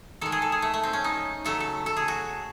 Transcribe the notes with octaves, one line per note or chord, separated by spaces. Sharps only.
D#3 G#3 A4
G#4
A4
G#4
A3
A3
C4
C#4
D#4
C#3 F#3 A3 A4
A4
A4
G#4
F#4